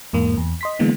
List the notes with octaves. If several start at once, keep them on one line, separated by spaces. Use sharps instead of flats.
E2 G#2 A#3
E2
D#5 C6 B6
D3 E3 G#3 A#3 B3